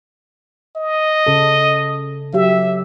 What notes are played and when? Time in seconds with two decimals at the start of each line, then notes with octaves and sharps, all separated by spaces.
0.76 D#5
1.27 C#3 A4
2.34 F#3 G4 E5